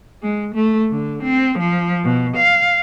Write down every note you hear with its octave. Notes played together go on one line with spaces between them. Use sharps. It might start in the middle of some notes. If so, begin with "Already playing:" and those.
G#3
A3
D3
C4
F3
B2
F5